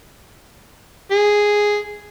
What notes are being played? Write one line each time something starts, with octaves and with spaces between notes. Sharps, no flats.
G#4